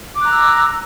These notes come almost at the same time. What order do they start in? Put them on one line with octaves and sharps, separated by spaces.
D6 F#6 A#5 E6